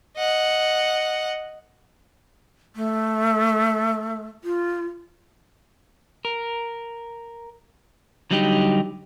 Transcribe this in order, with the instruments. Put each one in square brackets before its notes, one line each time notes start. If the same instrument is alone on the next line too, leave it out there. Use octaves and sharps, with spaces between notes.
[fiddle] D#5 F#5
[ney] A3
F4
[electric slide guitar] A#4
D3 F#3 G3 D#4 G4